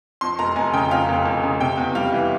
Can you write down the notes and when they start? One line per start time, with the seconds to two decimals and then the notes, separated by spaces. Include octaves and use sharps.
0.21 F2 C6
0.39 F1 A#5
0.56 F1 G#5
0.73 C#3 G5
0.91 F2 F5
1.09 F1
1.26 F1
1.44 C#3
1.60 C3 G5
1.78 E2
1.95 G3 F5
2.12 E3